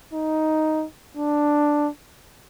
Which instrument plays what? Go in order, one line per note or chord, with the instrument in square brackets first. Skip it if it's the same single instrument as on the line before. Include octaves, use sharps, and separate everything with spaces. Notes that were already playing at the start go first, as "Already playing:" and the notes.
[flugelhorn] D#4
D4